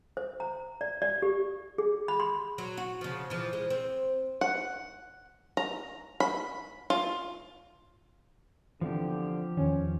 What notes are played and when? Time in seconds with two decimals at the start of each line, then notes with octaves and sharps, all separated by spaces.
0.17 C5
0.40 A#5
0.81 D5
1.02 D5
1.22 G4
1.78 G#4
2.08 B5
2.20 C6
2.58 F#3
2.77 F#4
3.01 C#3 F3
3.30 E3 F3
3.53 G#3
3.70 C4
4.41 F#5
5.57 A#5
6.20 B5
6.90 F4
8.81 D3 E3 F3 B3 C4 G4
9.57 E2 D#3 C#4